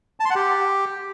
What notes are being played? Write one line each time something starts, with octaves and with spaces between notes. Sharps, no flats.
A5
C6
F#5
G4